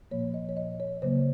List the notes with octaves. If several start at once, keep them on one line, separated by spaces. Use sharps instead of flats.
A#2 F3 A#3 C#5
D#5
C#5
D#5
C#5
C#3 F#3 A#3 C5